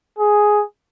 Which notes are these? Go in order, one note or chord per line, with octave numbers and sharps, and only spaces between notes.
G#4